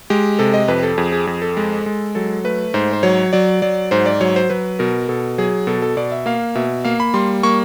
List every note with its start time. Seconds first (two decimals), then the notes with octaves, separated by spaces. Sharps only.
0.10 G#3 G4
0.39 C3 A4
0.54 D#5
0.68 F2 B4
0.83 A4
0.98 F2 G#4
1.12 G#4
1.27 F2 G#4
1.42 A4
1.57 G#3
1.86 G#3
2.15 F#3 A4
2.44 A3 B4
2.74 G#2 C5
2.93 C5
3.03 F#3 C#5
3.33 F#3 D5
3.62 F#3 D5
3.91 G#2 C5
4.06 D5
4.21 F#3 C#5
4.36 C5
4.50 F#3 B4
4.79 B2 A#4
5.09 B2 A4
5.38 F#3 G#4
5.67 B2 A4
5.82 A4
5.97 B2 D5
6.12 E5
6.26 A#3 F5
6.55 B2 E5
6.85 A#3 F5
7.00 B5
7.14 G3 C6
7.43 A#3 C#6